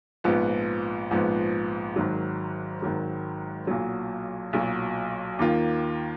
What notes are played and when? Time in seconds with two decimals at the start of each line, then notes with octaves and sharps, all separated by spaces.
0.24 A#1 G#2 F3 B3
1.11 A#1 G#2 F3 B3
1.96 G#1 G#2 D#3 F#3
2.82 G#1 G#2 D#3 F#3
3.67 B1 A#2 F#3
4.53 B1 A#2 F#3
5.39 D#2 D#3 A#3 F4